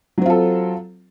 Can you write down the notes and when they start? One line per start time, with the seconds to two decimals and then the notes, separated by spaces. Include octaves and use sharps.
0.18 F#3
0.22 C4
0.26 F4
0.30 A4